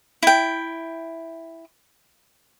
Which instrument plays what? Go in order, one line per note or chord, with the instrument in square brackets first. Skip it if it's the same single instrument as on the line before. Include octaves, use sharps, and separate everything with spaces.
[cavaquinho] E4 G5